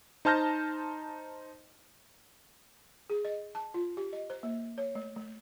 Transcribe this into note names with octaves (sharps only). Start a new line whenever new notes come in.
D#4 C5 A5 F6 G6 A#6
G#4
D#5
A5
F4
G4
D#5
C5
A#3
C#5
A3
A3